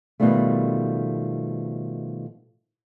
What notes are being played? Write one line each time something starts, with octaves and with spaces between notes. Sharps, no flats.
B2 D#3 F3 G3 A3